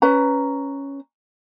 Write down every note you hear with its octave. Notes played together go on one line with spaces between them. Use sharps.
C#4 B4 A#5